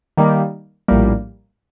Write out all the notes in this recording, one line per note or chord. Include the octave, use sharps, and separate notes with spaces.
D#3 G3 A#3
A#1 A2 G3 A#3